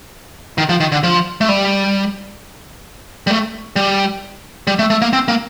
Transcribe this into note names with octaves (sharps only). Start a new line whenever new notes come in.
D#3
F3
D#3
D3
F3
A3
G3
G3
A3
G3
G3
A3
A3
A#3
C4
A#3